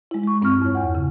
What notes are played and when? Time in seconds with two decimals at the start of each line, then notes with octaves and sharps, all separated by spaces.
0.11 G#3 E4
0.23 G#3 C#6
0.42 G2 C4 E4 C#6 F6
0.61 F2 C#5
0.75 E2 F#5
0.95 C#3